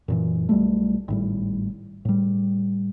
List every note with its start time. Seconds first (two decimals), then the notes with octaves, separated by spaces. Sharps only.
0.08 F#2 A#2 E3
0.49 B1 G3 A3
1.08 G#1 A2 G3
2.05 A2 G3